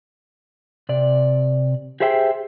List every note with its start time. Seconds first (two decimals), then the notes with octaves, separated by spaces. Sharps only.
0.89 C3 D5
2.00 G4 G#4 C5 E5 F5 G5